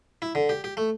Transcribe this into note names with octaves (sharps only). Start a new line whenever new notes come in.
E4
D3
G4
G4
A3